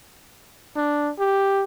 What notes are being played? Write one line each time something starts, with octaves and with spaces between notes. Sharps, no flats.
D4
G4